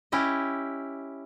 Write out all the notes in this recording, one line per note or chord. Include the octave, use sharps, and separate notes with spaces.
C#4 E4 G4 D#5